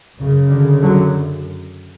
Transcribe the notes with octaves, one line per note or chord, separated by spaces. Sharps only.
F#2 C#3
D3
D3 F#3